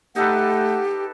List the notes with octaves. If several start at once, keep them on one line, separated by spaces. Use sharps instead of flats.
A3 D#4 G4 A4 B4 F#5